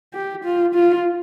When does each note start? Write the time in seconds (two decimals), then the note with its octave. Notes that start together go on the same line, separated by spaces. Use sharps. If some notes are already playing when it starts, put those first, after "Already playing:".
0.14 G4
0.44 F4
0.75 F4